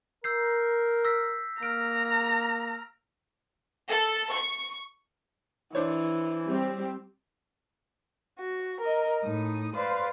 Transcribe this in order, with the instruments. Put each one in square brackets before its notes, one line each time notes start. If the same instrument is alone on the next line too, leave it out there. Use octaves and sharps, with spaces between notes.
[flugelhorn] A#4 [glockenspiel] E6 G6 C7
[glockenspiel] E6 A#6 B6
[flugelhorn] A#3 [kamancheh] A#5 [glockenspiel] F6 D7
[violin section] A4
C#6
[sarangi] E3 [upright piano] D4 C5 C#5
[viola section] G3 C4 G4
[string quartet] F#4
A#4 D#5
A2 D#4 D#6
B4 C5 D5 F5